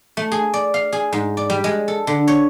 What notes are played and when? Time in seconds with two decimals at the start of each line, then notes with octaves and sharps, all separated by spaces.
0.17 A3
0.32 G#4
0.54 D5
0.74 F5
0.93 G#4
1.13 G#2
1.37 D5
1.50 G3
1.64 G#3
1.88 A4
2.07 D3
2.28 C#5